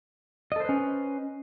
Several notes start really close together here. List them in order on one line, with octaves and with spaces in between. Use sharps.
D#5 A4 C5 B4 C#4